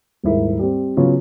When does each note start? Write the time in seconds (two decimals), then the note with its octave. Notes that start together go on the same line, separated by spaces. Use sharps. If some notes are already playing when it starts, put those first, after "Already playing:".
0.23 D#1 G#2 E4 A#4
0.59 G3 C4
0.97 C#3 F#3 B3 F4